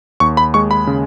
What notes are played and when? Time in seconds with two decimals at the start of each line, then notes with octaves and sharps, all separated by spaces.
0.20 D#2 C#6
0.37 B5
0.54 G#3 C#6
0.71 B5
0.87 C#3